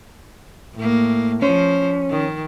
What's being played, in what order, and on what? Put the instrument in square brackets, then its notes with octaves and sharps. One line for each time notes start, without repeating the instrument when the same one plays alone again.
[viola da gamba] A2 A#3
[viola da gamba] F3 C5 [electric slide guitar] C#4
[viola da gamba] D#3